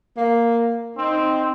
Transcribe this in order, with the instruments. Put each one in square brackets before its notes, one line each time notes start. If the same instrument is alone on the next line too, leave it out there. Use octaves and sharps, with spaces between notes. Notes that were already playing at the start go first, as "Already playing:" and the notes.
[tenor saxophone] A#3
[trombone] C4 [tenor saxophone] D#4